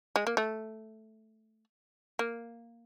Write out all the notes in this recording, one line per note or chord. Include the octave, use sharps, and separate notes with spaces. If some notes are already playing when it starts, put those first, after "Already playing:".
G#3
A#3
A3
A#3